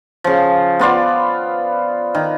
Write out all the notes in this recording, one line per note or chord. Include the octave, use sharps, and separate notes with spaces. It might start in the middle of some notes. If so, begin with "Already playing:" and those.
C#3 F3
B3 F4 D5 F5
D#3